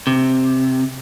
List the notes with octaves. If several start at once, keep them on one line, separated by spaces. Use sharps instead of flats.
C3